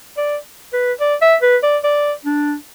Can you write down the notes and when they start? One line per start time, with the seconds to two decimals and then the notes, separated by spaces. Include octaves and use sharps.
0.17 D5
0.73 B4
1.00 D5
1.22 E5
1.42 B4
1.63 D5
1.84 D5
2.25 D4